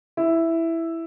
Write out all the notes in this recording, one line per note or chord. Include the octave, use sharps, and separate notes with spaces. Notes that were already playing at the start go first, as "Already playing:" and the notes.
E4